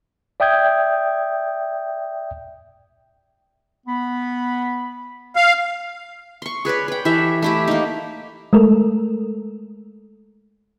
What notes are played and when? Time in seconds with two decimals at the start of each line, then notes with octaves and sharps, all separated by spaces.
0.40 D5 E5 G5 D#6 G6 G#6
3.86 B3 B5
5.36 F5
6.42 C6 C#6
6.65 G#4 B4 C#5 D5
6.88 B4 G5
7.05 E3 G4 A4 E5
7.42 A3 E4 G4
7.68 A#3 D#4
8.53 G#3 A3 A4 A#4